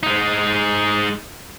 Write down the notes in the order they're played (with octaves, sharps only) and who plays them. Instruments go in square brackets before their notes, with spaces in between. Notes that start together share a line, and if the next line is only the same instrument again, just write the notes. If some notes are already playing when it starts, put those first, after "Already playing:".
[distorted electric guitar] G#3 D#4